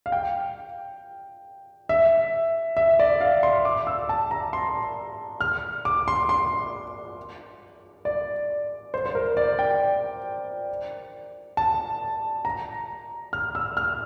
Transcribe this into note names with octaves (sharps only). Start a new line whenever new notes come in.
F5
G5
E5
E5
D5
F5
C6
D6
E6
A5
A#5
C6
F6
D6
C6
C6
D5
C5
C5
A#4
D5
G5
A5
A#5
F6
E6
F6